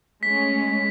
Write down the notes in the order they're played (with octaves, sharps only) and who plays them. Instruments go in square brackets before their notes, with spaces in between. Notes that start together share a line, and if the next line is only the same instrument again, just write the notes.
[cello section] G#3 A3 C#4 [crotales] B6